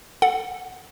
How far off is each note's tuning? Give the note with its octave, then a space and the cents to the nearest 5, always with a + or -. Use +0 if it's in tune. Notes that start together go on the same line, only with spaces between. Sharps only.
A4 +0 F#5 -15